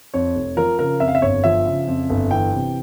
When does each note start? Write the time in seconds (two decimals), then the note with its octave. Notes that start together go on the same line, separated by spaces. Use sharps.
0.14 F2 C#5
0.35 F1
0.57 F3 A#4
0.79 C#3 A#4
1.00 F2 E5
1.08 F5
1.15 E5
1.22 G1 C#5
1.44 F3 E5
1.66 C#3
1.88 F2
2.10 G1
2.31 E3 G5
2.53 C3